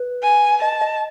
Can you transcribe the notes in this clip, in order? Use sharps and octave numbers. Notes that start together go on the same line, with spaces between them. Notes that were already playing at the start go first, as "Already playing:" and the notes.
Already playing: B4
G#5
D#5 A5
D#5